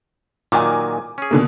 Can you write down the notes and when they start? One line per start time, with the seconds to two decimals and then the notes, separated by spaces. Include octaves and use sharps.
0.52 A#2 D#3 F#3 G#5 D6
1.18 C#4 G#4
1.31 B2 D3 A#3